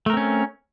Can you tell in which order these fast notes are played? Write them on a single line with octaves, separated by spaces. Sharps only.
A3 A#4 C4 C#4